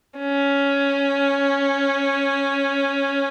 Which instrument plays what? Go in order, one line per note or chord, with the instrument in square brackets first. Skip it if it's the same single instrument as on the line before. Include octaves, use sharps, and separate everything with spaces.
[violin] C#4